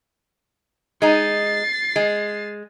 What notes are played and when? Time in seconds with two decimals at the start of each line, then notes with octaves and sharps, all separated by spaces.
1.02 G#3 D#4 A6 C7
1.96 G#3